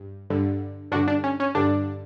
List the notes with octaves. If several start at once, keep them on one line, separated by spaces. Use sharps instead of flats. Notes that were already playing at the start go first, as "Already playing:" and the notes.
Already playing: G2
G2 D3
G2 D3 D4 F#4
D4
C#4
C#4
G2 D3 D4